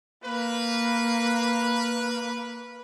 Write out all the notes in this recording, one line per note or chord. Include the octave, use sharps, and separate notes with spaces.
A#3 B4